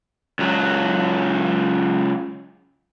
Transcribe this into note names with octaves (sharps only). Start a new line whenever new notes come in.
C#2 F#3